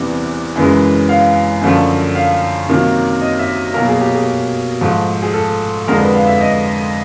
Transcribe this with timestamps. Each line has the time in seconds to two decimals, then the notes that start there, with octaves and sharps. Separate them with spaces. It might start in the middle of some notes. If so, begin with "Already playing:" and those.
Already playing: E2 C3 E3 G3
0.56 F#2 C#3 E3 G#3
1.09 F5
1.62 F#2 D3 F3 A3
2.15 F5
2.69 C3 D#3 F#3 A#3
3.21 D#5
3.39 E5
3.74 B2 F#3 A#3 A#4
3.89 G#4
4.01 G4
4.15 G#4
4.81 G#2 F3 A3
5.22 G#4
5.34 A4
5.87 F2 D3 F3 G#3 A#4
6.01 B4
6.15 F5
6.27 E5
6.41 D#5